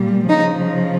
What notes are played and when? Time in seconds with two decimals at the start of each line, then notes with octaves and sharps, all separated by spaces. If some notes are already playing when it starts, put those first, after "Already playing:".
Already playing: A#2 G3
0.28 C#3 F3 D#4